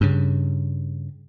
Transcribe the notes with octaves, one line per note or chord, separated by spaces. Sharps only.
G2 C#3